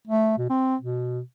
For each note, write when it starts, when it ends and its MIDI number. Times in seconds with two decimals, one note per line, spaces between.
0.07 0.35 57
0.38 0.48 47
0.50 0.76 60
0.82 1.20 47